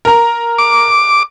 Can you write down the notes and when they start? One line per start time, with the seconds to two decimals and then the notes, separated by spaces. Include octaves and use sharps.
0.05 A#4 A#5
0.58 D6